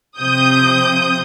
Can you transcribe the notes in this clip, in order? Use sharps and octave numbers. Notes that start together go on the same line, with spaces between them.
C3 F3 C4 D#6 G6